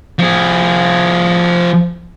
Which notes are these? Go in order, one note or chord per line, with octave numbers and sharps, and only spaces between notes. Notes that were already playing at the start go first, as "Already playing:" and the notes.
F3 G#4